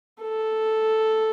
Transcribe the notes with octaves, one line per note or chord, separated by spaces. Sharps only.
A4